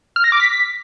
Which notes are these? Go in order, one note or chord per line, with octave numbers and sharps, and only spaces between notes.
F6
A#6
D6
B6